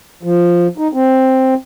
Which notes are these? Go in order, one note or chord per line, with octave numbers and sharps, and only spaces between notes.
F3
D#4
C4